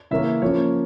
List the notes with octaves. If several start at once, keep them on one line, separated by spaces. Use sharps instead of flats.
C#3 E3 A#3 C#4 E5
F3 A#3 C#4 C#5